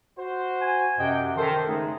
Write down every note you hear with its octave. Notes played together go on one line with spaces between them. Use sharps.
F#4 C5
G#5
F#2 C3 D#5 F#5 G5
D#3 A4 C5
C#3 G#3 A3 D#4 G#4